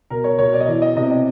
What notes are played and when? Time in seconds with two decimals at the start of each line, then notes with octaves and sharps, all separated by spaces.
0.10 B2 A#4
0.24 C#5
0.39 B2 C#5
0.54 D5
0.60 D#5
0.68 E3 D5
0.82 D#5
0.96 C3 D#5
1.11 D#5